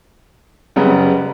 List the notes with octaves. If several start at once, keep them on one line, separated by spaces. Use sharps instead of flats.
F#1 F#2 C#3 G3 B3